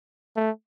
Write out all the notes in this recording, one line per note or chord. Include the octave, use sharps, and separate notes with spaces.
A3